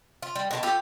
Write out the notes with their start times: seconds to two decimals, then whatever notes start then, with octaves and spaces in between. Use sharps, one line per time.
0.22 F4
0.35 G3
0.51 B2 F#4 A5
0.63 F4 G4 A4